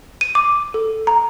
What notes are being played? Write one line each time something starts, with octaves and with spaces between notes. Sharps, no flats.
D#7
D6
A4
A#5